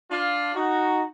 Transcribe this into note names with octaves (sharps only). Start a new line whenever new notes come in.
D4 F4
D#4 F#4